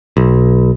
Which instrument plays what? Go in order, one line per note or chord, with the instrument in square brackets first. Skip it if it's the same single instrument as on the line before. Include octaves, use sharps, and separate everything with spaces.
[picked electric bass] B1